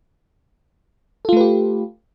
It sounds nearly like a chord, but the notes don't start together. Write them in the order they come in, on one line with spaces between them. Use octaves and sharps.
A4 F4 A3 B4 G4